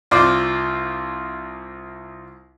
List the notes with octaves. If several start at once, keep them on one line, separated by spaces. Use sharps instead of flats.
C2 F4 C5 D5 C6 D6